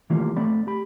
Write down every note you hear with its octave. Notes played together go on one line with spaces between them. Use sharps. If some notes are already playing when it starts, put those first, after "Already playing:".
D#3 E3 G3 A3 A#3 F4
A3 C4 D5 B5
G4 B5